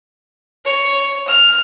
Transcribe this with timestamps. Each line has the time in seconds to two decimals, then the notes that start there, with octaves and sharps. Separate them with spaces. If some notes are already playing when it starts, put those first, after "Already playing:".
0.65 C#5
1.28 F6